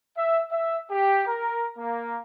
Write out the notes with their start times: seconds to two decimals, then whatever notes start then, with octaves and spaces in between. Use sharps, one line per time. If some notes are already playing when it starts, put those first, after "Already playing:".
0.17 E5
0.52 E5
0.90 G4
1.27 A#4
1.78 A#3